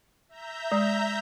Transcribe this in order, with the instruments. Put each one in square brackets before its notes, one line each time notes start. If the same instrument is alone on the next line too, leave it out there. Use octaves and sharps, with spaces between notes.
[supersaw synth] E5 A#5 G6
[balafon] G#3